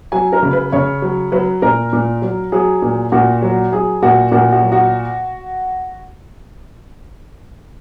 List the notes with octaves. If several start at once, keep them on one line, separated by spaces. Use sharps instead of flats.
F#3 G#5
A#4
C#3
B4
C#3 C#5
F#3
F#3 B4
A#2 A#4
A#2
F#3
F#3 G#4
A#2
A#2 F#4
F#3
F#3 G#4
A#2 F#4
A#2 F#4
F#4
F#3
F#4